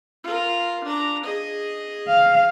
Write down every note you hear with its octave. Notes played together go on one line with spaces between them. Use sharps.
F4 A#4
D4 A#5
G#4 D#5
F5